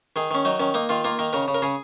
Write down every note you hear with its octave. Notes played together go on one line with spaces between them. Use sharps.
D#3 G#4
D#3 C#4
F#3 D#4
D#3 C#4
A#3 D#4
D#3 F4
A#3 F4
D#3 A#4
C#3 A#4
C#3
A#4
C#3 G#4